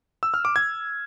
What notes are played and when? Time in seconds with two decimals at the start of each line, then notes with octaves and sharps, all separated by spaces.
0.23 E6
0.34 F6
0.45 D6
0.56 G#6